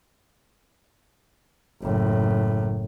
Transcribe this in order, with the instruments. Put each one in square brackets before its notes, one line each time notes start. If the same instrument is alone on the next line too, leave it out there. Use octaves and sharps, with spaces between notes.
[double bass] F#1 A2